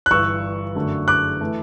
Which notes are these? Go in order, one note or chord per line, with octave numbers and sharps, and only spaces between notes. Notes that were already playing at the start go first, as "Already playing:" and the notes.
F#6
G1 G2 E3 C#6 E6
F#2 D3 A3
D6 F#6
E3 A3